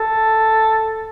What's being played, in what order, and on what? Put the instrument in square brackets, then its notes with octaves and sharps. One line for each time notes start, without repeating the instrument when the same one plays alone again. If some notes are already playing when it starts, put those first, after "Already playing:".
Already playing: [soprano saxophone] A4